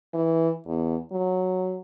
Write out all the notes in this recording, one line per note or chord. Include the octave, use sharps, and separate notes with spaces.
E3
E2
F#3